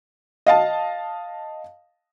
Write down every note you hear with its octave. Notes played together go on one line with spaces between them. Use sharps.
D#5 F5 A5